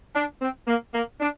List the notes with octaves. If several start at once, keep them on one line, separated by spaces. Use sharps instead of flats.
D4
C4
A#3
A#3
D4